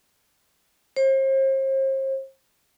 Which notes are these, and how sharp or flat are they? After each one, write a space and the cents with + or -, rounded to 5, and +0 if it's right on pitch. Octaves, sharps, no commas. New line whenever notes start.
C5 +40